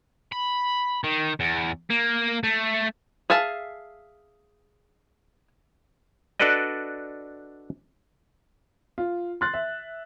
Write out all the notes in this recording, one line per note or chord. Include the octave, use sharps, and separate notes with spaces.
B5
D#3
E2
A#3
A3
G#4 E5 F5 A5
D4 F#4 A4 B4 D5 D#5
F4
C6 F#6 A6
E5